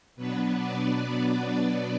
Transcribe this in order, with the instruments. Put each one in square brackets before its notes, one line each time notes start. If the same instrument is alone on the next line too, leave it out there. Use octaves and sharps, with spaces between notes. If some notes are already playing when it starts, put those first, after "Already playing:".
[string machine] B2 F#3 B3 D4 B4
D5
D5